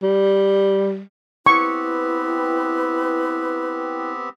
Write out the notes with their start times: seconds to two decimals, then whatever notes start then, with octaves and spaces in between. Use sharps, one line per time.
0.03 G3
1.46 B3 C4 E4 G4 B4 C#6